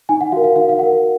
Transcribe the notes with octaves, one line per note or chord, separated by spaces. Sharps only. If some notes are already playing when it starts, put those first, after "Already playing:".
D#4 G#5
F#5
F#4 A#4 F5
F5
D#4 F5
F5
F#4 A#4 F#5